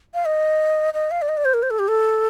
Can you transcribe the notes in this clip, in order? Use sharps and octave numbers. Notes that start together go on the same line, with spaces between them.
F5
D#5
D#5
F5
D5
D#5
D5
C5
A#4
C5
A4
G4
A4